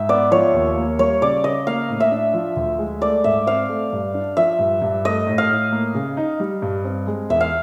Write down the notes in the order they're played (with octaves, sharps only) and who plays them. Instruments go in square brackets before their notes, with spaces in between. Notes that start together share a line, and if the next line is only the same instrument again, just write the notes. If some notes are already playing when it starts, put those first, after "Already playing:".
Already playing: [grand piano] G#2 [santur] E5
[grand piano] B3 [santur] D5
[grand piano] F3 [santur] C#5
[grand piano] D#2
A#3
[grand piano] G3 [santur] C#5
[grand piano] C#3 [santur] D5
[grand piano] C#3 [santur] D#5
[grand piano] A#3 [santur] F5
[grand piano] A2
[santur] E5
[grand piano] D4
F3
D2
G#3
[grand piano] A3 [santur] D5
[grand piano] G#2 [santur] E5
[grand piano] C4 [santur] F5
[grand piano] A3
G2
D4
[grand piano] F3 [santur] E5
[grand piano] G2
G2
[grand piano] A3 [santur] D#5
[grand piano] A2
[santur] F5
[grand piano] A2
A#3
C#3
D#4
G3
G2
C4
G#3
[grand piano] E2 [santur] E5
[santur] F5